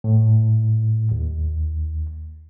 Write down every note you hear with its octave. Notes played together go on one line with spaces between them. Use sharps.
A2
D#2